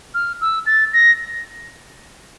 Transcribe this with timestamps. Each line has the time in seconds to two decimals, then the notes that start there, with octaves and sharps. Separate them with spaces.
0.14 F6
0.41 E6
0.66 A6
0.93 A#6